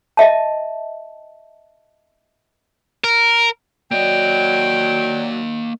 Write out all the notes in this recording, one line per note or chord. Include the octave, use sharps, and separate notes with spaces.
D#5 E5 A5
A#4
F#3 A#3 D5 D#5 G5